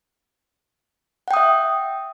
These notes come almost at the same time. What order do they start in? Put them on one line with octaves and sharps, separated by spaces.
F#5 G5 D#6 E5